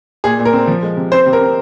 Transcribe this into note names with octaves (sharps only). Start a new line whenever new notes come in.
A#2 G#4
A#2
A#4
C4
F3
G#3
C3
C4 C5
C3
A#4
C4